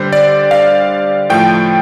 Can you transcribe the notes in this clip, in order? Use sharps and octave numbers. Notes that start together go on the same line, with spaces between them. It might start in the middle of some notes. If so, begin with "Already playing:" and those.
Already playing: D3 G3 C5
D5
F5
A2 F3 A3 G5